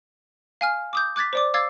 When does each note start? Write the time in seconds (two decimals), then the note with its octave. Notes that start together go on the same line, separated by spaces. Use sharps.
0.61 F5 G#5 F6
0.93 D6 D#6 G6
1.16 D6 F#6 G#6 A6 B6
1.33 C5 D5 D6
1.54 F5 D6 E6 G#6 A6 C7